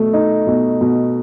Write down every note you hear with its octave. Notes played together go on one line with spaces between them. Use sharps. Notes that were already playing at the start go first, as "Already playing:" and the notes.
Already playing: B2 A3
D#4
B2
B2